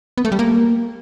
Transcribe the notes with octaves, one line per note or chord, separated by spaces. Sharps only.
B3
A3
G3
A#3